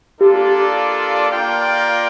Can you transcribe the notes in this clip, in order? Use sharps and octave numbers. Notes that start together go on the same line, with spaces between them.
A#3 D4 F4 G4 A4 D5
A#3 F4 A#4 D5 G5